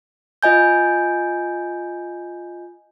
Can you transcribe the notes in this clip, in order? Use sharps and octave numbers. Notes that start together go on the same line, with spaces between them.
F4 D#5 G#5 G6